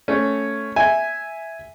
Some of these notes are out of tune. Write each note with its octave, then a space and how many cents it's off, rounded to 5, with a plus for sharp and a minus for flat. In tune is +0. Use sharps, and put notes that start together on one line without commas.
A3 +0 C#4 +0
E5 +0 G#5 +0